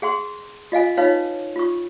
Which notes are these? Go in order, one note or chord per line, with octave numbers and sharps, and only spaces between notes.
G#4 F#5 C6
F4 D#5 F5 G#5
D#4 F4 B4 C#5 F5
F4 C#6